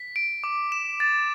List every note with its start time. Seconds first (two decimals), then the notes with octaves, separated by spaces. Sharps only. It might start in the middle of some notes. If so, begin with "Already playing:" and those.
Already playing: B6
0.16 D7
0.44 D6
0.72 E7
1.00 A6